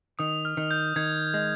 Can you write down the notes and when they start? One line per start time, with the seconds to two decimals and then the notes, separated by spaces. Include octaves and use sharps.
0.19 D#3 D#6
0.45 F6
0.57 D#3
0.71 G6
0.96 D#3 G#6
1.34 G#3